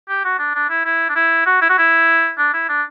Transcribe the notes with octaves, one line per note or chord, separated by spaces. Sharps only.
G4
F#4
D4
D4
E4
E4
D4
E4
F#4
E4
F#4
E4
D4
E4
D4